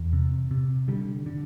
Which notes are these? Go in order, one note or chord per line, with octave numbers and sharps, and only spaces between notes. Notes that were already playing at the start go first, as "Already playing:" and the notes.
Already playing: E2
C3
C3
D3 G3
D3